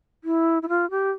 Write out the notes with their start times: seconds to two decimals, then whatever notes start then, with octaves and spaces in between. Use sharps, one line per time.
0.24 E4
0.63 E4
0.69 F4
0.91 G4